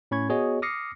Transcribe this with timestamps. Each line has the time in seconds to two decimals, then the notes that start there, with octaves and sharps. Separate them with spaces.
0.11 A2 C#4 B5 C#6 G#6
0.29 B3 F#4 G#4 C#5 D#5
0.62 D6 D#6 F6 A#6 C7 C#7